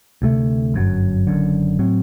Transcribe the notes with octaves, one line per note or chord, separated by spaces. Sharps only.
D2 C3 F#3 A3
G1 F#2 F#3
F#1 F#2 D3
A2 F#3 C4